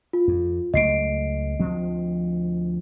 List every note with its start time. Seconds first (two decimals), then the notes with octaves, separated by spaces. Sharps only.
0.13 F4
0.28 F2
0.74 C#2 F#3 A3 D#5 C7 D7
1.60 D2 F3 C4